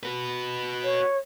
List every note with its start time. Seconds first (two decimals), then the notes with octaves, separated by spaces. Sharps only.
0.03 F#4 B4
0.83 C#5